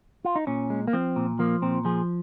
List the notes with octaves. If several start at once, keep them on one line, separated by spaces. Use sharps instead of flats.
F4
D#4
A#2 C#4
G#3
A#3
F3 C4
A#2
F3 A#3
A#2 C4
F3 G#4